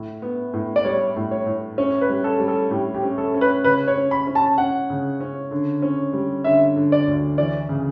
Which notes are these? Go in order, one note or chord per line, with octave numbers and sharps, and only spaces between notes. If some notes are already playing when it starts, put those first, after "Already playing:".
Already playing: A2
B3
A2
D5
G3 C#5
A2
C#5
A2
C#4 C#5
B4
G3
A4
G3
A4
A2 G4
G4
C#4
A4
C#4
B4
C#3 B4
C#5
C#4
B5
C#4
A5
C#4 F#5
C#3
C#4
D3
C#4
G3
D3 E5
D3
D5
D2
E3 D5
C#3